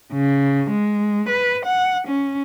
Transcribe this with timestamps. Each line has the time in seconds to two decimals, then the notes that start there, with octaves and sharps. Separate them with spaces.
0.13 C#3
0.71 G#3
1.29 B4
1.65 F#5
2.07 C#4